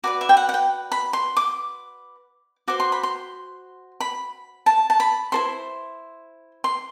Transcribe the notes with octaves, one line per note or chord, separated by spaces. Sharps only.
F#4 B4 D5 D6
E5
G5
F#5
F#5
G5
B5
C6
D6
F#4 C5 D6
C6
B5
C6
B5
A5
A5
B5
E4 A4 C5 C6
C6